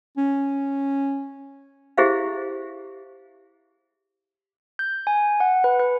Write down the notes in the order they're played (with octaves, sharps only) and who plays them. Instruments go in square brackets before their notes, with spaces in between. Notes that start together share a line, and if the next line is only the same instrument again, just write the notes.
[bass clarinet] C#4
[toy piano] E4 G4 G#4 C5 E5 F5
[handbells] G6
G#5
F#5
B4
B4